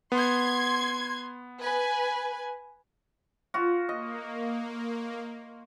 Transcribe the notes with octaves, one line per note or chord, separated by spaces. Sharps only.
B3 C6 G#6
B4 G#5
F4 F#4
A#3 D#5